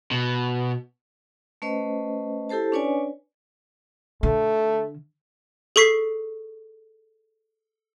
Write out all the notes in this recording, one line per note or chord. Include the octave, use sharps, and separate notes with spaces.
B2
A3 C#4 B4 C5 D#5
E4 G4 A4 C5 A5
C#4 D4 B4 C#5 D5 G#5
D3 A3
G#4 A4 C#6 B6 C7